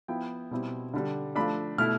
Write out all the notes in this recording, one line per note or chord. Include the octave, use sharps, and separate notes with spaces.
F3 B3 E4 G5
B2 G3 C4 E4
D3 G3 D4
F3 A3 D4 B5
B2 A3 E4 F6